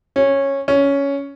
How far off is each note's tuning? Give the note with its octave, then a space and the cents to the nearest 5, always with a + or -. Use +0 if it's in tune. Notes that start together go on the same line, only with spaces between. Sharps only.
C#4 -10
C#4 +10